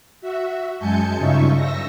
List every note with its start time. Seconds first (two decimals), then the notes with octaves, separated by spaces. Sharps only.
0.21 F#4 E5
0.79 F#2 G#3 G#5 A5 G6 C#7
1.17 G2 C#3 D#4 F4 E5 C#6
1.55 E6 A#6